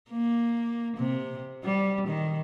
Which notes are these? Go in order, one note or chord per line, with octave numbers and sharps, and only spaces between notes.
A#3
C3
G3
D#3